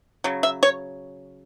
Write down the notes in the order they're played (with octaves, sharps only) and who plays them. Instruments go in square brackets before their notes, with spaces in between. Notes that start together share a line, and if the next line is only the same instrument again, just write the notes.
[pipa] C#3 F#3
E5
C#5